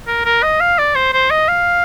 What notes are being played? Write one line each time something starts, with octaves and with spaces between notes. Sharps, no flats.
A#4
A#4
D#5
F5
D5
C5
C5
D#5
F5